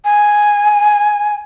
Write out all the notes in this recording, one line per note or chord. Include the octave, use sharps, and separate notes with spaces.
G#5